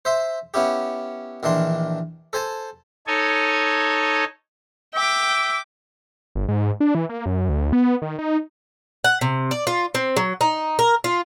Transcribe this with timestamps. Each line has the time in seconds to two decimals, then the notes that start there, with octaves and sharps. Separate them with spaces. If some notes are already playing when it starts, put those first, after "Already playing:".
0.05 C5 E5 C6
0.54 B3 C#4 E4 G4
1.43 A#1 D#3 E3 D4 C6
2.33 A4 C5 G#5 A5
3.07 D#4 A4 C#5 G#5
4.95 E5 G5 D6
6.35 G1
6.48 G#2
6.80 D4
6.95 E3
7.09 A#3
7.26 F#2
7.49 D2
7.73 B3
8.02 D#3
8.19 D#4
9.04 F#5
9.21 C3
9.51 D5
9.67 F4
9.95 C4
10.17 F#3
10.41 D#4
10.79 A#4
11.04 F4